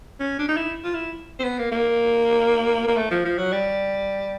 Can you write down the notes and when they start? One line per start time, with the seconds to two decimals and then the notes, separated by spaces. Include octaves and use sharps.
0.20 C#4
0.39 D4
0.48 D#4
0.57 E4
0.84 F4
0.94 E4
1.40 C4
1.44 B3
1.59 A#3
1.72 A#3
2.88 A#3
2.97 A3
3.11 F3
3.25 F3
3.38 F#3
3.52 G3